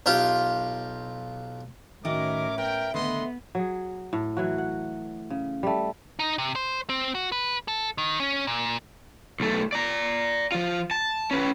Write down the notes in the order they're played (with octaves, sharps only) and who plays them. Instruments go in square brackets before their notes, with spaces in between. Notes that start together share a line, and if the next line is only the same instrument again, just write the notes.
[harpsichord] B1 F4 G4
[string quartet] A2 C#4 [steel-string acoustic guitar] D#3 F#4 D#5 [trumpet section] A#4 D6 [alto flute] E5
[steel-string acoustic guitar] B3 [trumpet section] A#4 G5
[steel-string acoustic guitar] D3 D#3 A3 [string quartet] B3 [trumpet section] B4 D#5 C6
[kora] F#3 G#4
A2
E3 F#3 F#4
F#5
C#3
G3 A3
[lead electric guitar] D#4
C3
C5
C4
F#4
B4
A4
D#3
C#4
A#2
[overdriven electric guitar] B1 A3
D5 A#5
F3 F4
A5
C#4 B4